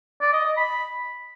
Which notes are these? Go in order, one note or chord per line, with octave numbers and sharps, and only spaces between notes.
D5
D#5
D#5
B5